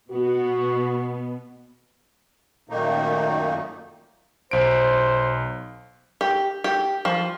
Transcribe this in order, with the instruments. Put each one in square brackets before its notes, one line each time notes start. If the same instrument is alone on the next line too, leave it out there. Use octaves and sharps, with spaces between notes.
[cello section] B2 B3 [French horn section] F#4
[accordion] F#2 A#2 D#3 A3 A#3 D#4
[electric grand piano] B1 D7 [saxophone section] C5
[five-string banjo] G4
G4
F3